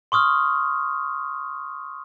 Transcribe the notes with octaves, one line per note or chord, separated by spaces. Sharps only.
C6 C#6 D#6 F6